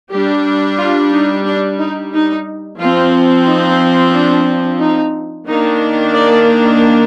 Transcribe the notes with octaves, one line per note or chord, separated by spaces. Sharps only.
G3 D4 G4
F4
D#4
D4
D#4
D#4
F3 C4 F4
D#4
D4
D#4
D#3 A#3 D4 D#4
D5